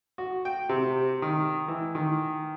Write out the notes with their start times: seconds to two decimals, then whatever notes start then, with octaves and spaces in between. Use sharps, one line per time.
0.18 F#4
0.45 G5
0.69 C3
1.22 D#3
1.68 E3
1.95 D#3